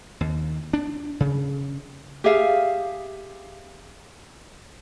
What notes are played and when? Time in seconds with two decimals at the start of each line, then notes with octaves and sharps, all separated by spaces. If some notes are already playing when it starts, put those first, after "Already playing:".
0.21 D#2
0.73 D4
1.20 C#3
2.24 G4 G#4 E5 F5